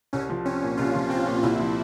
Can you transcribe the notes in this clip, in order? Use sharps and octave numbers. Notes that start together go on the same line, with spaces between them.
C2 C#4
F3
C4 C#4
A#2
C2 F4
F3
C4 F4
A#2
C2 E4
F3